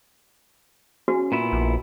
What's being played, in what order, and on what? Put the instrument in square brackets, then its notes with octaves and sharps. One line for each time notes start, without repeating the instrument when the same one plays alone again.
[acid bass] C#4 [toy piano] F#4
[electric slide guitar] A#2 B3 E4
[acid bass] A#1